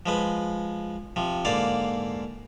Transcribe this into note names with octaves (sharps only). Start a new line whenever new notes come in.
F3 G#3 B4
C3 F3
G#2 D3 A#3 D5 F5